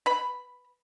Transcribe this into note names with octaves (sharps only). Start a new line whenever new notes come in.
B4 B5